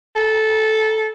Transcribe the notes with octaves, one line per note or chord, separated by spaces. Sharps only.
A4